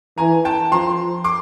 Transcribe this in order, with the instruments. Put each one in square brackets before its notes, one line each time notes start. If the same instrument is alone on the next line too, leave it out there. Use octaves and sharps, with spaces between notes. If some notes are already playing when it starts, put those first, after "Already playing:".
[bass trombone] E3 [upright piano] G#5 A#5
[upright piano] G5 A5
[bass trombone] F3 [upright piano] A#5 C6
[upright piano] C6 D6